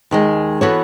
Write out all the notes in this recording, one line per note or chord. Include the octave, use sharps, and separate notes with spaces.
D#2 D#3 G#3
E3 B3 F#4 A4 C#5